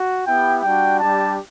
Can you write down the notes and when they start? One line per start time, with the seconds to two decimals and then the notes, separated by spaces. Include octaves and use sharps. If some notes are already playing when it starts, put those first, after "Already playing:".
Already playing: F#4
0.26 B3 E4 G4 G5
0.63 G3 D4 F#4 G5
1.00 G3 D4 G4 A5